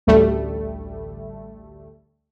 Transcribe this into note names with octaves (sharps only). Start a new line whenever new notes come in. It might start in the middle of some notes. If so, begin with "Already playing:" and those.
A1 D2 G3 A3